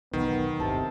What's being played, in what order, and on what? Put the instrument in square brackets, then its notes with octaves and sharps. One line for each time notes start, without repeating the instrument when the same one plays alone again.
[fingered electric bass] B1 E2 [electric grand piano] D#3 [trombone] B3
[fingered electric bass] D1 G1 [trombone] C3 [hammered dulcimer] E4 A4 A5